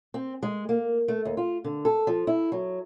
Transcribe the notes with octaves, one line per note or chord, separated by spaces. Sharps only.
C4
G#3
A#3
A3
D#2
F4
D3
A4
F3
E4
F#3